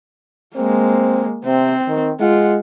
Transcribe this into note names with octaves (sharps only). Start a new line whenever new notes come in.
G#3 A#3 C4
C3 C4
D#3
G#3 F4 F#5